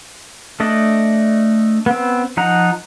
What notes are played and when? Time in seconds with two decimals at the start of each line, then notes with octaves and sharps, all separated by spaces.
0.60 A3 D4 D5 D#5
1.86 B3 C4
2.37 F3 D#4 F#5 A#5